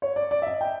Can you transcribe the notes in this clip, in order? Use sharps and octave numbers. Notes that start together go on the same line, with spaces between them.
C#5
D5
D5
E5
D#5
G5